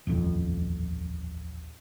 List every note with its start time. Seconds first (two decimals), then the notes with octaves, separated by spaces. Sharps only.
0.07 D#1 A1 F2